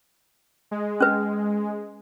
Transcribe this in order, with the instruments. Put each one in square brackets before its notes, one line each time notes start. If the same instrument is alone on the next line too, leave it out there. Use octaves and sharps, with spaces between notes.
[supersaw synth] G#3
[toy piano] C#4 B4